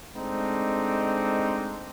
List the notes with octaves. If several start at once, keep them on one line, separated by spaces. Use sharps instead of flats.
G#3 A3 C4 D4 D#4